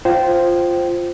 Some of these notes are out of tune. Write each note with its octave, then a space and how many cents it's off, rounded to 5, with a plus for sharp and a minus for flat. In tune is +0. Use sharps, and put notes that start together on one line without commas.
F4 +0 C5 +0 G5 -20